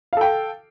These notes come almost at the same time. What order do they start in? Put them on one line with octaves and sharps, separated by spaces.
F5 A4 G5